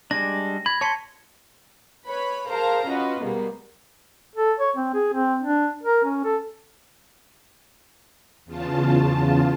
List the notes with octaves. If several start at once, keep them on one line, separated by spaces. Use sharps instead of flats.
G3 G#3 D4 A#6
B5 G#6
C#5 A5 B5 C6 C#7
B4 C#5 B5
G#4 A#4 C5 F5 A5 A#5
C#4 F4 F#4 B4 D#5
B2 G3 G#3 A#3 B3
A4
C#5
C4
G#4
C4
D4
A#4
C#4
A4
E2 C#3 F4 A5